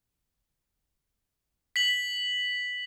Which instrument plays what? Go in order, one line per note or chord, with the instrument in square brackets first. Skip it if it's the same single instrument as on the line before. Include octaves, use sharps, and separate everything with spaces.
[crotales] B6 F#7